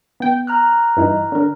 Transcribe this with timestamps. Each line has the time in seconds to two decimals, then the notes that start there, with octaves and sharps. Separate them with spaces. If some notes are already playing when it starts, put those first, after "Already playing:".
0.20 B3 G5
0.47 A#5 F6 F#6
0.97 G2 E3 D#4
1.32 D3 A#4